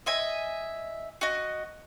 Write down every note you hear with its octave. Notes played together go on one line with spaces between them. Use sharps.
D#5 E5 G#5
F#4 D#5